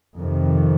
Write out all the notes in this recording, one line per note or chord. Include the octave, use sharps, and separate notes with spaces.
F2 C3 D#3